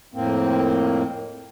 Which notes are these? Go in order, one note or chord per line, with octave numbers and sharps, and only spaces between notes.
F2 A2 A#3 C4